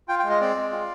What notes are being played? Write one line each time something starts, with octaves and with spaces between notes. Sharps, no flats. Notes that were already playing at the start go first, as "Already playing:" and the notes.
F4 G5
G5
G#3
D#5
C4 D5
G#3
F4